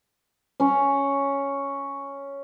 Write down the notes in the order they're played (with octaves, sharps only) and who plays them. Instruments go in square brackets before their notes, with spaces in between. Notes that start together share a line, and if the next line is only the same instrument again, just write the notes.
[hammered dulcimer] C#4 C#5